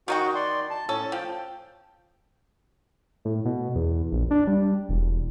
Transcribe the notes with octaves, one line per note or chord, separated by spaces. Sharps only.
D#3 D#4 F#4 F#5 G5
D5 C6
A5
A2 C#4 A4
F3 G5
A2
B2
E2
A#1
D4
G3
E1